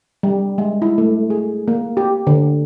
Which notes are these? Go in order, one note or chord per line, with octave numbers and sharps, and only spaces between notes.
G3
G#3
E4
A3
G#4
A#3
G4
D3